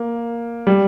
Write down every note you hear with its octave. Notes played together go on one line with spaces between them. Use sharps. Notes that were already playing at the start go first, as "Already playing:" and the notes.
Already playing: A#3
G3